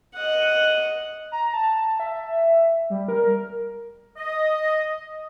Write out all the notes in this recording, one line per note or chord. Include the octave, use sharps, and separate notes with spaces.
D#5 F#5
A#5
A5
E5
G3
A#4
D#5